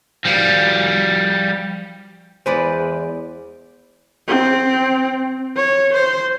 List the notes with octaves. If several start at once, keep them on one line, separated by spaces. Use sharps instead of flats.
F3 G3
E2 G#3 B4 C5 D5
C4
C#5
C5